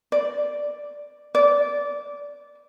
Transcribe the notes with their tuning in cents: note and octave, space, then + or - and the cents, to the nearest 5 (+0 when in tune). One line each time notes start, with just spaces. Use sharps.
D5 +0
D5 -20